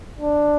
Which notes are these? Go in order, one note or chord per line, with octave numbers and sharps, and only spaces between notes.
D4